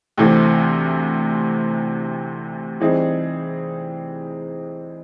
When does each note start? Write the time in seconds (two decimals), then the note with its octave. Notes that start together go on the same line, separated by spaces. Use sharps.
0.18 D2 C3 E3 A3 C4
2.80 E3 G3 C4 D#4 G#4